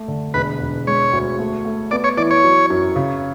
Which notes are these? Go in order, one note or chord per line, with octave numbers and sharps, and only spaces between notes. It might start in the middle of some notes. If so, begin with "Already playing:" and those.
Already playing: A3
D3
E1 B4
E1
G#3 C#5
D2
A3
A3
B3 D5
C#5
E3 D5
C#5
F#3
F#2
C#3